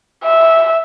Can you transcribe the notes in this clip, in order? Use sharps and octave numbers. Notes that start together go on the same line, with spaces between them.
E5